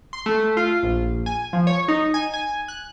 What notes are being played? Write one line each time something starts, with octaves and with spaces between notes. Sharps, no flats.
C6
A3
F4
A#1
G#5
F3
C#5
D#4
G#5
G#5
F#6